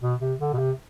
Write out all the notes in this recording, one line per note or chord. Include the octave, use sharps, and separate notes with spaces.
B2
C3
D3
B2
C3